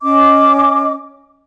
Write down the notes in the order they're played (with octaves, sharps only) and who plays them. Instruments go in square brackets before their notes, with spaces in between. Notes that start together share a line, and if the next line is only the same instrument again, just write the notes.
[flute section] C#4 D#5 D6